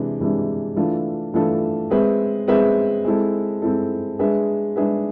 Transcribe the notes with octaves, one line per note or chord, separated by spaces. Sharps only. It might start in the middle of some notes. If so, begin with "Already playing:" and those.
Already playing: C3 E3 G#3 D4
C3 E3 G#3 D4
E3 A3 D4 F4 A4
E3 A3 D4 F4 A4
G#3 C4 G#4 B4 E5
G#3 C4 G#4 B4 E5
G#3 C4 E4 A4
G#3 C4 E4 A4
G#3 D4 G#4 B4 E5
G#3 D4 G#4 B4 E5